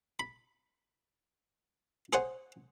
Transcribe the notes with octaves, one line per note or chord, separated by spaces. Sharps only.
B5
G#4 C5 C#5 F#5 G#5